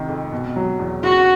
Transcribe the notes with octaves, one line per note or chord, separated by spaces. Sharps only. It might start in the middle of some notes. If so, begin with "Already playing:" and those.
Already playing: C3 D#3
F2
B2
F#3
E2
C#3 F#4